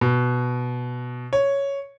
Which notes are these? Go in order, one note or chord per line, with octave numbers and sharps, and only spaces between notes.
B2
C#5